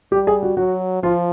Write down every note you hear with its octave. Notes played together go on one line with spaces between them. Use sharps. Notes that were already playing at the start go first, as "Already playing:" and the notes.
G3 G4
G#4
F#4
F#3 F#4
F3 F4